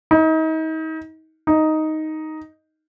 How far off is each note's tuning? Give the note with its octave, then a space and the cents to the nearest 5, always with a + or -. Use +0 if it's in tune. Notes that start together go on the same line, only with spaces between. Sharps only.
D#4 +35
D#4 +5